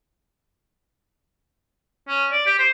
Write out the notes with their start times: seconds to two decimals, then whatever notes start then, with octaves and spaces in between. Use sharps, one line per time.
2.08 C#4
2.32 D5
2.46 G4
2.59 C5